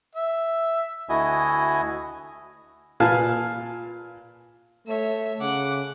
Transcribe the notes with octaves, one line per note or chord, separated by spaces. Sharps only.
E5
D2 A3 E4 F#4 D#5 G#5
A#2 B4 F5 G#5 A5 F6
A3 C#5 E5
C#3 F#5 D6